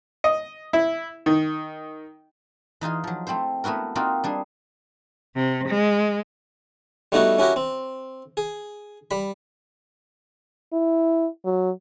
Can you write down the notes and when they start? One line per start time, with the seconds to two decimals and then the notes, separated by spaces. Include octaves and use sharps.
0.24 D#5
0.73 E4
1.26 D#3
2.81 E3 D#4 F4 G#4
3.04 F3 F#3
3.27 A3 C4 E4 C5
3.64 A3 B3 E4 F#4 A#4
3.95 A#3 C4 D#4 F4 F#4
4.24 G3 D4 G#4
5.36 C3
5.69 G#3
7.12 G3 A3 B3 D#4 E4 F#4
7.39 C#4 E4 F#4 G4 A#4
7.56 C4
8.37 G#4
9.11 G3 B5
10.73 E4
11.45 F#3